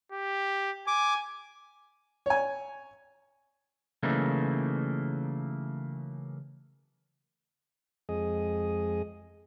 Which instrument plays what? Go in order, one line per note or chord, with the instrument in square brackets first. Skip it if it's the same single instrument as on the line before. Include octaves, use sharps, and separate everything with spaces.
[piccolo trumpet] G4
[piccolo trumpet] G#5 [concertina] D6
[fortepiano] C#5 G#5
[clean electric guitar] C#3 E3 F#3 A3 A#3 D#4
[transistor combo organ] F2 G#3 G#4 D#5